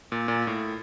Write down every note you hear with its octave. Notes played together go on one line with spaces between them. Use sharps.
A#2
A#2
A2